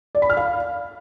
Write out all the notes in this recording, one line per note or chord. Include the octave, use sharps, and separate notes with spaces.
D5
B5
F6
F5